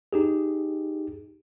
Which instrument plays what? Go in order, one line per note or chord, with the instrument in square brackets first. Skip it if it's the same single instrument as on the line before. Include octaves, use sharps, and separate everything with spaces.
[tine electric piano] D#4 G4 G#4